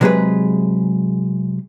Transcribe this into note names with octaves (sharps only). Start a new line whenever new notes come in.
C3 F#3 G#3 F#4 G#4 B4